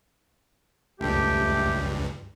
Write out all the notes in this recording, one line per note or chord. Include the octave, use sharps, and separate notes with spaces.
C#2 G2 A3 G4